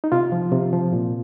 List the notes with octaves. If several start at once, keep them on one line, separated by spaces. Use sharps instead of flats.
D#4
C3 F4
F3
C3
F3
A#2